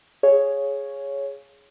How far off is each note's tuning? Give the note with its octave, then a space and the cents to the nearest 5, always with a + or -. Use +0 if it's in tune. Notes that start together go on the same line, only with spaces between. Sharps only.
G#4 +0 C#5 +0 F5 +0